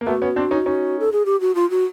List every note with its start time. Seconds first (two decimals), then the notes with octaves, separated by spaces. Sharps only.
0.01 A#3
0.06 A3 B3 F#4
0.22 B3 C#4
0.36 C4 D4
0.51 C#4 D#4
0.66 C#4 D#4
1.00 A4
1.12 G#4
1.26 G4
1.41 F#4
1.55 F4
1.70 F#4